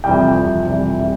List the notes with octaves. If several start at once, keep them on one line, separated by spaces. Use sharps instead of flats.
F2 C3 E3 G3 G5
F2 C3 E3 G3
F2 C3 E3 G3
C3 E3 G3